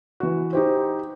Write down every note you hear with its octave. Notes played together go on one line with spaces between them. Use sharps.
E3 F#4
D#4 G4 C5